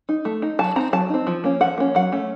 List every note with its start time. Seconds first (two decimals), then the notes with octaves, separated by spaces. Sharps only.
0.09 D#4
0.25 A3
0.42 D#4
0.59 F#3 A5
0.76 C4 D#4 A#5
0.93 F#3 A5
1.10 C4 D#4
1.27 F3
1.44 A#3 C#4
1.61 F3 F#5
1.78 A#3 C#4
1.95 F#3 F#5
2.12 A3 C#4